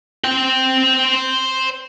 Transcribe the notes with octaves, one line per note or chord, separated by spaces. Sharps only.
C5 G5